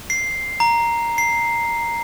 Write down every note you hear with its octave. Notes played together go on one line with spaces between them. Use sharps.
C7
A#5
C7